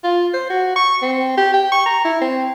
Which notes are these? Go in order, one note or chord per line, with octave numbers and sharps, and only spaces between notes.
F4
C5
F#4
C#6
C4
G4
G5
C#6
A#5
E4
C4